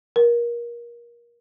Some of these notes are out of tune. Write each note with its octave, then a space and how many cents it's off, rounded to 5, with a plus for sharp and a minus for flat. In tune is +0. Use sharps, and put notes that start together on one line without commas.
A#4 +25